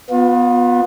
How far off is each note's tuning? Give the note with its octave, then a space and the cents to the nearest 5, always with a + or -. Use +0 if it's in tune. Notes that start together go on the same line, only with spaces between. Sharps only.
B3 +0 F4 +35